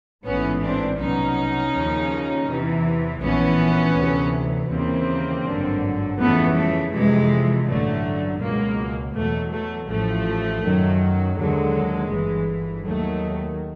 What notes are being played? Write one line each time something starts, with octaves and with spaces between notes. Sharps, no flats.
A1 G#2 E3 B3 C#4
C4 D4
C2 B2 F#3 C#4 D#4
D#2 C#3 F3
E2 C3 E3
A#1 A2 E3 B3 C#4
D2 C3 E3
D#2 C#3 E3 A#3 C4
G#1 G2 D3 F#3
F2 C#3 E3 A3 B3
A3
F2 C3 E3 G#3
A1 G2 D3 F#3 A3
C#2 B2 F#3 G#3 A#3
E2 B2 F#3 A3
A3
A1 A2 F3 A3
F#2 D#3 F#3
D#2 D3 F#3 G#3
G1 G2 E3
D#2 D#3 F#3 A3